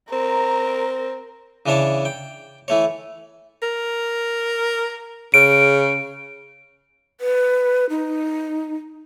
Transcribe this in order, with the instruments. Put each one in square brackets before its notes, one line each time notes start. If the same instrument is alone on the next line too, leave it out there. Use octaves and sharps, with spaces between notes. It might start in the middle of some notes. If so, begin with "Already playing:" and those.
[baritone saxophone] C4 [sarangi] A#4 [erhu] A#5
[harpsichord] C#3 E3 D4 C#5 A5
G5
E3 A3 C#5
[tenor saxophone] A#4
[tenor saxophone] C#3 [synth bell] D7
[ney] B4
D#4